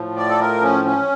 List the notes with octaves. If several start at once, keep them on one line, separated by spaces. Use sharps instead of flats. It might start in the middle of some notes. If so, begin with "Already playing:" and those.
Already playing: A2 F3
D5
A4
A#4
C#4
C#4